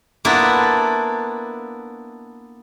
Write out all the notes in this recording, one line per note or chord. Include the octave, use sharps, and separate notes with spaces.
A#3 B3 D4 E4 F4 A4